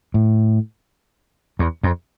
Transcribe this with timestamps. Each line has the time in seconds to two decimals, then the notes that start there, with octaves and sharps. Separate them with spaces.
0.14 A2
1.59 E2
1.83 F2